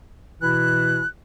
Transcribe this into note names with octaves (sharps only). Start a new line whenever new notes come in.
B2 E3 E4 F#6